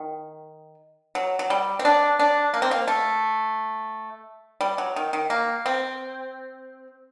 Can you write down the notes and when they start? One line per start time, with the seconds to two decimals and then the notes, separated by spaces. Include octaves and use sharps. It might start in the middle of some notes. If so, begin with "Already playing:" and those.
Already playing: D#3
1.15 F#3
1.39 F#3
1.50 G3
1.79 C4
1.85 D4
2.19 D4
2.54 A#3
2.62 C4
2.71 A#3
2.88 A3
4.61 G3
4.78 F#3
4.96 D#3
5.13 D#3
5.30 A#3
5.66 C4